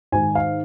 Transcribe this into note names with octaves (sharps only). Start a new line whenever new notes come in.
G#2 D#3 G#5
F5